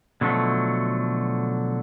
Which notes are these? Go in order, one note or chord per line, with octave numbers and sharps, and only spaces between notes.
B2 D3 F3 F#3 A3